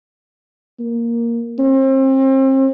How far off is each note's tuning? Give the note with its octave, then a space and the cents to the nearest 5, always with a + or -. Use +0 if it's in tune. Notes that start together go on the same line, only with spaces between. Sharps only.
A#3 +0
C4 +35